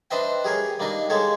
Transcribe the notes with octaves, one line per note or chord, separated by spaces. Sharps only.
D4 B4 C5 D#5 E5 G5
G4 G#4 A#4 C#5
G3 A#3 D4 D#4 D#5
G#3 A#3 G4 A4 C#5